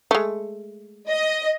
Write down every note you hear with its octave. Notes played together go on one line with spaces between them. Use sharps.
G#3 A3
D#5